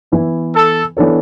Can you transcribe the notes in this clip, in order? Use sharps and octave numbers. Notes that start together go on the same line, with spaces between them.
E3 B3 E4 B4
A4
E3 B3 D4 A4 C#5